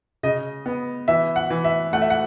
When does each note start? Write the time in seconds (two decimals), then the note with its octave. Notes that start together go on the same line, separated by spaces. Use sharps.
0.23 C#3 D#5
0.66 B3
1.08 E3 E5
1.36 F#5
1.50 E3
1.64 E5
1.93 A3 F#5
2.02 E5
2.10 F#5